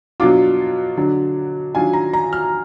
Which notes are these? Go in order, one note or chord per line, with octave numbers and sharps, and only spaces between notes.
B2 F#3 D4 F4 D6
D3 F#3 D4
D#3 F#3 D4 F4 G#5
A#5
A#5
F6